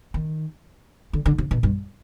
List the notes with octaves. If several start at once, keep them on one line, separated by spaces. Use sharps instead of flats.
D#3
D3
D3
C3
B2
G2